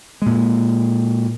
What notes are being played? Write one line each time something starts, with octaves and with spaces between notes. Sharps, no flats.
A#2 G#3